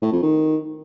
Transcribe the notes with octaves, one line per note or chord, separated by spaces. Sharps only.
A2
F2
D#3